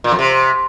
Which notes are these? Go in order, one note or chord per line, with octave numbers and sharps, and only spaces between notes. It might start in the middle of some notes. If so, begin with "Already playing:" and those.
A#2
F2
C3